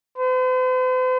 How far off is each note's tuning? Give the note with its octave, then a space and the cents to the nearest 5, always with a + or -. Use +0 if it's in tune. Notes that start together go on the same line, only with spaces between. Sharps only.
C5 -45